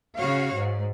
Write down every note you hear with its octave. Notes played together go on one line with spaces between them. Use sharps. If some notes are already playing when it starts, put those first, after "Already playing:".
C#3 F#4 C#5 F5
G#2